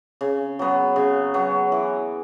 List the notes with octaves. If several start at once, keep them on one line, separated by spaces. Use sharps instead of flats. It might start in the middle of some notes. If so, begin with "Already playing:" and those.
C#3
F#3 B3
C#3
F#3 B3
E3